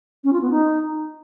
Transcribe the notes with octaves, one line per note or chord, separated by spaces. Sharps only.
C#4
F4
B3
D#4